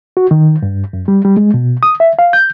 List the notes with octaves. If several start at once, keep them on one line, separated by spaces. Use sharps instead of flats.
F#4
D#3
G2
F#2
G3
G3
G#3
B2
D#6
E5
F5
G6